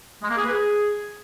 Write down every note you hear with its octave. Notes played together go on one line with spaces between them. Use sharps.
G#3
A#3
G#4
B4
G#4